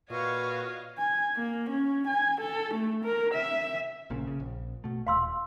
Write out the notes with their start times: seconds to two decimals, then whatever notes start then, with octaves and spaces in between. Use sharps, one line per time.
0.10 A#2 F#4 B4 C#5 D#5 F5 C#6
0.99 G#5
1.37 A#3
1.70 C#4
2.07 G#5
2.41 A4
2.74 A3
3.05 A#4
3.34 E5
4.10 A#1 A#2 C#3
4.27 C#3
4.40 A#1
4.84 B2 A3
5.07 D#1 F5 C6 E6